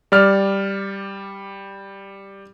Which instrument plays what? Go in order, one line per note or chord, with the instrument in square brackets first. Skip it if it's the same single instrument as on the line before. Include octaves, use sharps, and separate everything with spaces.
[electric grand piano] G3 D5 F6